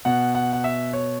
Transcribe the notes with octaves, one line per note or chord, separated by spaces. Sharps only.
B2 F#5
F#5
F#5
E5
C#5